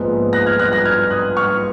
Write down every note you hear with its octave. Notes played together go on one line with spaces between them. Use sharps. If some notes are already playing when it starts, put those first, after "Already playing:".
Already playing: A#1 G#2 F3 G#3 B3
F#6 A#6
F6 G#6
F#6 A#6
F#6 A#6
F6 G#6
D#6 F#6
C#6 F6